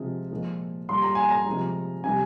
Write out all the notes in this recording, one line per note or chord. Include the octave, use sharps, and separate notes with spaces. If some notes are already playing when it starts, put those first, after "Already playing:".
Already playing: C3 F3 G#3
A#2 F3 G#3
A#2 G3 C6
A#5
G#5
A#5
C3 F3 G#3
C3 G3 G#5